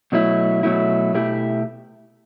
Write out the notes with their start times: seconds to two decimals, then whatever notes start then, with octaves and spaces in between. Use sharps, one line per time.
0.12 B2 F#3 A3 E4
0.63 B2 F#3 A3 E4
1.14 B2 A3 E4 G4